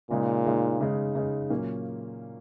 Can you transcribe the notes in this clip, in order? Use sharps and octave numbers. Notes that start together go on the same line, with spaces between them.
A#2 C#3 G#3 D#4
C#3 G#3 D#4
C#3 G#3 D#4
C#3 G#3 D#4
A#2 F#3 A#3 C#4